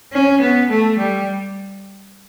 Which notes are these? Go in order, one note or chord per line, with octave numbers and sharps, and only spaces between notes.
C#4
B3
A3
G3